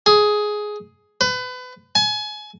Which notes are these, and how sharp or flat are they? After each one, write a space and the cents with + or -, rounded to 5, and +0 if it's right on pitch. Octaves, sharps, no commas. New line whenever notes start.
G#4 +10
B4 +30
G#5 +30